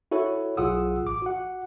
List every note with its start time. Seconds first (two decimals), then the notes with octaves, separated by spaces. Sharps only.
0.11 E4 F#4 A4 C#5
0.57 B1 F4 G#4 F#5 D#6 E6
1.03 A1 D6
1.22 F#4 F#5